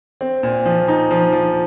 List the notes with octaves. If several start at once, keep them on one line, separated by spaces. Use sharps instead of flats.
C4
A#2
F3
D#4
F3
F3